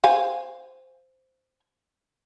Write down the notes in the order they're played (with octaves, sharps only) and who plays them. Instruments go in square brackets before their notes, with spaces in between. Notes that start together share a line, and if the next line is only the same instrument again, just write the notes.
[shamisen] C5 F5 G#5